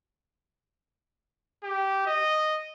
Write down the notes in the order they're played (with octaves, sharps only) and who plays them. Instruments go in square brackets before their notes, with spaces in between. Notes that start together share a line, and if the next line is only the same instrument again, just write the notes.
[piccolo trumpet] G4
D#5